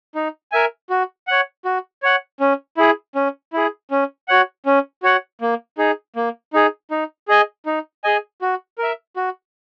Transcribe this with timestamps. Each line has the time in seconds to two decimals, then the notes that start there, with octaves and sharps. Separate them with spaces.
0.15 D#4
0.52 A#4 E5 G#5
0.90 F#4
1.27 C#5 F#5
1.65 F#4
2.03 C#5 F#5
2.40 C#4
2.77 E4 G#4
3.15 C#4
3.53 E4 G#4
3.91 C#4
4.28 F#4 C#5 F#5
4.66 C#4
5.03 F#4 C#5 F#5
5.41 A#3
5.78 D#4 G#4
6.16 A#3
6.53 D#4 G#4
6.91 D#4
7.28 G#4 D#5 G#5
7.66 D#4
8.04 G#4 D#5 G#5
8.42 F#4
8.78 A#4 E5
9.16 F#4